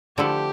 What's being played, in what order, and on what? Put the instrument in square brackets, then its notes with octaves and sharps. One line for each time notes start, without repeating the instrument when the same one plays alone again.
[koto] D3 F3 A3 E4 A4 [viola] G4